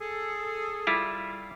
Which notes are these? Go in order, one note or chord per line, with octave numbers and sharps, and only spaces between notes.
G#4 A4
G3 E4 F4